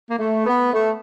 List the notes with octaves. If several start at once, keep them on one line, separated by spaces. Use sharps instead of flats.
A#3
A3
B3
A3